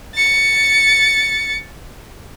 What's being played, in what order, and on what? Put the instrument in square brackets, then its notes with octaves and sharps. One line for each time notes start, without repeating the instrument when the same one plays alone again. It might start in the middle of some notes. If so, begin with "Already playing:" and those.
[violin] A6 C#7